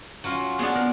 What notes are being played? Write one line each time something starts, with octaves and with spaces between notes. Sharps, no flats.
F#3 C#4 F4
B3 D4 G#4
A#4